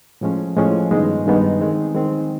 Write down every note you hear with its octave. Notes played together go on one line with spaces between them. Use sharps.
A2 F3 G#3 C#4
A2 F3 G#3 C#4
G2 D#3 G#3 B3 D#4
G2 D#3 G#3 B3 D#4
D#3 G#3 C4
D#3 G#3 C4